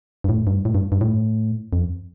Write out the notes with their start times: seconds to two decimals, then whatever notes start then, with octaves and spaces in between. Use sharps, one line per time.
0.24 G2
0.29 A2
0.47 G2
0.65 A2
0.75 G2
0.92 G2
1.01 A2
1.73 F2